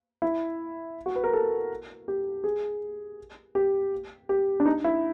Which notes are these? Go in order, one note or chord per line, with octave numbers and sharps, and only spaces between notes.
E4
F#4
B4
A#4
A4
G4
G#4
G4
G4
D4
D#4
E4